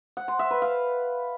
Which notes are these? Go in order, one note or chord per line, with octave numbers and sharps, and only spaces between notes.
F#5
C6
E5
B4
F5